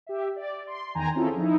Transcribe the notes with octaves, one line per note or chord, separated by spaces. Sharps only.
G4 E5
D5
C6
E2 D#3 G5 G#5 A#5
C4 C#4 E4 F4 G#4 A4
F3 D#4 E4